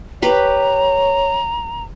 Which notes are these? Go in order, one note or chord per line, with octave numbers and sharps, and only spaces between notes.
G4 B4 C#5 A#5